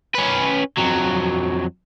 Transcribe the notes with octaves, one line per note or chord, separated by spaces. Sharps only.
C#4 B4
F2 F#3